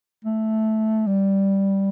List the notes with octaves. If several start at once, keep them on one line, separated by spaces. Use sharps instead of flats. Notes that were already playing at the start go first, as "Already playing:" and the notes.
A3
G3